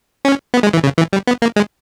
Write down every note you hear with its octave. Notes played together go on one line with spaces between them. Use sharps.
C#4
B3
G#3
E3
C#3
E3
G3
B3
A#3
G#3